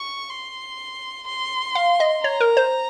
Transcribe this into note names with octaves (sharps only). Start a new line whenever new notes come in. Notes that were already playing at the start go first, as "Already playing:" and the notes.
Already playing: C#6
C6
C6
F5
D#5
C#5 A#5
A#4
C5